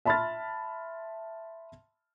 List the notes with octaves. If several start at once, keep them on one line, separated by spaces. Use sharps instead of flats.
E5 A5 B5 C6 F6 A6